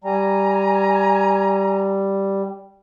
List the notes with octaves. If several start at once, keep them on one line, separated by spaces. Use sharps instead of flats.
G3 G#5 A#5